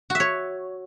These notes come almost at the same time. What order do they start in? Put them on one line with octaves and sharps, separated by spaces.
F#4 E5 C#5